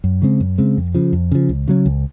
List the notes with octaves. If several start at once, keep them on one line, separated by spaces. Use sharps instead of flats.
F#2
C#3 G#3 C4
F#2
C#3 G#3 C4
F2
C#3 F3
F2
C#3 F3
C#2
C#3 F#3 C#4
C#2